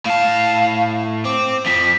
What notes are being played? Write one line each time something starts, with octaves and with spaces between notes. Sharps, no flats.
A2 F5 A5
C4 D6
F2 F3 B6